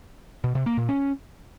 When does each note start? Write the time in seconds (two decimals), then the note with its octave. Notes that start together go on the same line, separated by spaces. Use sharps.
0.44 B2
0.55 C3
0.66 A#3
0.77 A#2
0.89 C#4